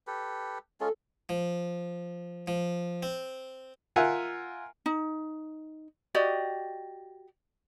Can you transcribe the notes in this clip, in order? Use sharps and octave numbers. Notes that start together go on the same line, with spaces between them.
G4 A4 B4
G#3 C#4 F4 A4
F3
F3
C4
F4 A#4 E5 F#5 G#5
D#4
F#4 G4 D5 D#5